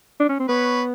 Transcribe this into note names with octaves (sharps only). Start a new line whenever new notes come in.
D4
C#4
C4
B3 B4 C#5